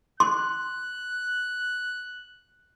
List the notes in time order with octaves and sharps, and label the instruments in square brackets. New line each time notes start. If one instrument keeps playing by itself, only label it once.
[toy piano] C6 [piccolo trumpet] F#6